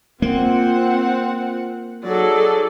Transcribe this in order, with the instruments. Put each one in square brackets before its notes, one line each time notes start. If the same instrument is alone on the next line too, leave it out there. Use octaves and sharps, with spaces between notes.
[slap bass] A#3 [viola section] C4 F4 F#5
[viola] F#3 A4 [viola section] D#4 G#4 D5